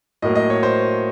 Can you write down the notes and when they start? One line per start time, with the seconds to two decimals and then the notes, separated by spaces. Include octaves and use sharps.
0.22 A2 F#3 A#3 D#5
0.35 D#5
0.50 C#5
0.63 C5